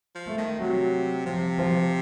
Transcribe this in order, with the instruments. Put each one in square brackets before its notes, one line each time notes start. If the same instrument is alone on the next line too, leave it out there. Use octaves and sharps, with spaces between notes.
[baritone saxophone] F3
[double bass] A3
[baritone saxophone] D#3
[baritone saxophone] C3 [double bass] F#3
[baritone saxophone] C3 [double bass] F3
[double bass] F3